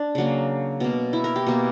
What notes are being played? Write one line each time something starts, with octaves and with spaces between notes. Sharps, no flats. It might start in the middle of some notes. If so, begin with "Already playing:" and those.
Already playing: D4
C#3 F#3 A#3
B2 A#3
E4
A#4
G4
B2 A#3